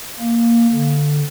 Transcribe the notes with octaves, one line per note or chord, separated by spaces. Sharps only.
A#3
D3